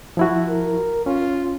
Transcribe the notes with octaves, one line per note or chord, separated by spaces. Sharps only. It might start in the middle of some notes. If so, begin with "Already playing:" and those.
F3 E4 F#4
A#4
C#4 F4